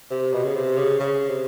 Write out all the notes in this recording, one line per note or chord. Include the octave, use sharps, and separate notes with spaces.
C3
B2
C#3
C3
C#3
C#3
C3